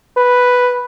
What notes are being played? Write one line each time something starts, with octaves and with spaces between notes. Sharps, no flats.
B4